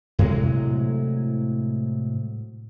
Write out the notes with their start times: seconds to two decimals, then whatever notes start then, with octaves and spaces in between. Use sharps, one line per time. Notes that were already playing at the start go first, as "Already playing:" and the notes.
0.19 A2 C3 F#3 G#3